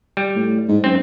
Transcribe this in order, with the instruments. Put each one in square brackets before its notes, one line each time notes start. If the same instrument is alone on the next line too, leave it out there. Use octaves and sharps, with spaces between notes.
[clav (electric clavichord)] G3
[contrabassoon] A2
G#2
[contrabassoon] F#2 [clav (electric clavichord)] C4